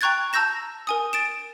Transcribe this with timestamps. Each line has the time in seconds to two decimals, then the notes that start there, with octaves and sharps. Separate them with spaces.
0.01 G5 A#5 C#6 F#6 G#6 A6
0.33 A5 A#5 E6 G6 A#6 E7
0.87 A#4 G#5 D#6
1.13 A6 D7 E7